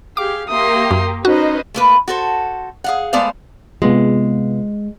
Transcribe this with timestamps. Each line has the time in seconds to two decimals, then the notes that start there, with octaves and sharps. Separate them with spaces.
0.17 G4 G#4 F5 D6
0.49 A#3 G4 E5 C6 D#6
0.91 F#2
1.25 C#4 D#4 F#4 B4 C5 D#5
1.74 A3 A#3 B4
2.08 F#4 A4 C5
2.84 G#4 F5 F#5
3.13 G#3 A3 B3 C5 D5 F5
3.82 C3 G#3 B3 F4